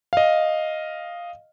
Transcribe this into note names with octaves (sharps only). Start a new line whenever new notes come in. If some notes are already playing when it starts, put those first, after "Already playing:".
D#5 F5